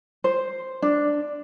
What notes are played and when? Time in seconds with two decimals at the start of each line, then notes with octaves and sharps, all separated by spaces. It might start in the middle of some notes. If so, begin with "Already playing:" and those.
0.24 C5
0.82 D4